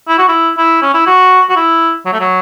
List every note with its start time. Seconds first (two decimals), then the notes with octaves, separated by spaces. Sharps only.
0.08 E4
0.18 F#4
0.28 E4
0.58 E4
0.82 C#4
0.94 E4
1.07 F#4
1.49 F#4
1.56 E4
2.06 F#3
2.13 A3
2.20 F#3